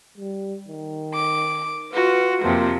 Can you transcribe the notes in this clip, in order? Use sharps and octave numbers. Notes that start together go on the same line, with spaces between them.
G3
D#3
D6
F4 F#4 B4
F2 C3 F3 A#3